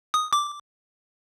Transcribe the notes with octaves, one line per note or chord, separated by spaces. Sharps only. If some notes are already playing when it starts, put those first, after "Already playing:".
D#6
D6